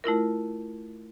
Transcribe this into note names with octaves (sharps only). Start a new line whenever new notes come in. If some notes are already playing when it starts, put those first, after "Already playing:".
A3 E4 F4 A#4